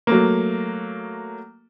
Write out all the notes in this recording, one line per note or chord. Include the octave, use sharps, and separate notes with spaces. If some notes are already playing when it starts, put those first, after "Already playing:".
F#3 A3 A#3